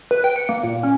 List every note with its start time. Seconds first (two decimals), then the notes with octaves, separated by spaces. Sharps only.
0.11 B4
0.24 G5
0.36 C#7
0.49 A#3
0.63 A#2
0.83 C#4